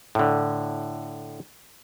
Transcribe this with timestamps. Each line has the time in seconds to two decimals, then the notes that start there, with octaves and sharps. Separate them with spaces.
0.15 A2 D3